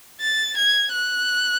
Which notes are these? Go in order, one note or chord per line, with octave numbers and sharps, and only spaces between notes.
A6
G#6
F#6